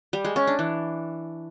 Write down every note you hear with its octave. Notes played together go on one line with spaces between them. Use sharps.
G3
G#3
C#4
D4
E3